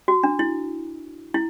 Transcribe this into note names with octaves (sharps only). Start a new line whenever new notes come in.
F#4
D4
E4
E4